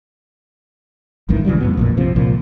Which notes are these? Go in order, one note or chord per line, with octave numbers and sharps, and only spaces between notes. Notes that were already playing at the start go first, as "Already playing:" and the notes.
G#1 C#2 D#3 E3
C#3 E3 F#3 G3
F2 A2 B3
A#1 F2 A#2
C3 F3
C2 A#2 F3